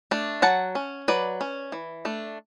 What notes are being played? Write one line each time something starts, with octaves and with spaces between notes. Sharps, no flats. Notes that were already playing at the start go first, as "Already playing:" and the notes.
A3 D4
F#3 F#5 A5
C#4
F#3 B4 D5
C#4
E3
A3 D4